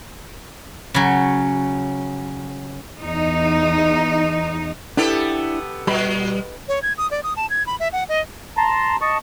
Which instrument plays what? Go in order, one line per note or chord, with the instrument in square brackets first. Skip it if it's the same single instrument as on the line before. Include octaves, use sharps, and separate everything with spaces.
[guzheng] C#3 F#3
[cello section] E2 D#4
[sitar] B3 G4 A4 [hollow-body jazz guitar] D4 E4
[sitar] A#2 [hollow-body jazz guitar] G3 B5
[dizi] C#5
G#6
D#6
D5
D#6
A5
G#6
B5
E5
F#5
D#5
[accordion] A5 A#5 C6
D#5 A5 C#6